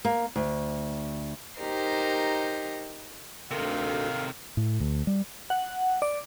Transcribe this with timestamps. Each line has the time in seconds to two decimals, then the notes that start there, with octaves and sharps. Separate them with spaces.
0.05 A#3
0.36 D2
1.59 D#4 G4 A#4 C5 A#5
3.51 D2 C3 D#3 A4 A#4 F5 C6
4.57 A2
4.80 D2
5.07 G3
5.50 F#5
6.02 D5